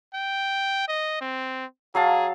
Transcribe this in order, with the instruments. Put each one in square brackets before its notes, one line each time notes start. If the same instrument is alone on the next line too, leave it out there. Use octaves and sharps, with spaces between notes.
[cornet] G5
D#5
C4
[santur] F#3 F5 A5 [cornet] G#4